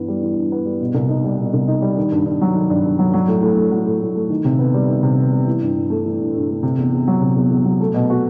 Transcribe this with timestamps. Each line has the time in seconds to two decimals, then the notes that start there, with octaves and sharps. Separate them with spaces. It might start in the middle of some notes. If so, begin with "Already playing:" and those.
Already playing: G2 E3 B3
0.08 G3
0.23 E3
0.36 G2
0.52 B3
0.65 G3
0.81 B2
0.95 C2
1.09 D#4
1.24 G3
1.38 B2
1.54 C2
1.68 D#4
1.82 G3
1.97 D#3
2.12 G2
2.26 G2
2.41 F#3
2.55 D#3
2.70 G2
2.85 G2
2.99 F#3
3.14 F#3
3.28 A2
3.42 A2
3.57 A3
3.72 F#3
3.86 A2
4.01 A2
4.15 A3
4.30 D#3
4.45 C3
4.59 B3
4.74 G3
4.88 D#3
5.03 C3
5.18 B3
5.32 G3
5.47 E3
5.62 G2
5.77 G2
5.90 A3
6.05 E3
6.20 G2
6.35 G2
6.49 A3
6.63 C3
6.78 E2
6.93 E2
7.07 F#3
7.21 C3
7.36 E2
7.51 E2
7.65 F#3
7.81 A3
7.94 B2
8.10 F#4